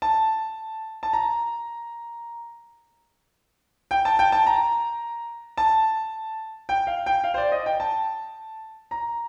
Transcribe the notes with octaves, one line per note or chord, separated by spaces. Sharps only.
A5
A5
A#5
G5
A5
G5
A5
A#5
A5
G5
F5
G5
F5
C5
D5
D#5
G5
A5
A#5